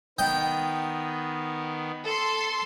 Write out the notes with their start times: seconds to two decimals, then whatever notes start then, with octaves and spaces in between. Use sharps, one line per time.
0.18 D#3 B3 D#5 G5
2.04 A4 C6